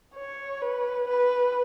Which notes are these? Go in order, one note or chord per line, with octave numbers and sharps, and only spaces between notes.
C#5
B4
B4